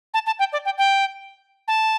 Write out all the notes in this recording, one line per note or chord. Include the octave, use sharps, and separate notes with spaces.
A5
A5
G5
D5
G5
G5
A5